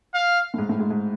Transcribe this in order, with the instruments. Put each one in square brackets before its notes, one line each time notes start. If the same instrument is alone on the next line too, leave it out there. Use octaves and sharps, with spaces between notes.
[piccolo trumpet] F5
[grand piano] A2
G#2
A2
G#2
G#2